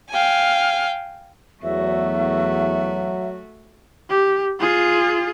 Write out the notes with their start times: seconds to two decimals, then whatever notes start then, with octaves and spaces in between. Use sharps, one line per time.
0.10 F5 G5 G#5
1.63 E2 F#3 A3 F#4 E5
4.10 G4
4.60 F4 G#4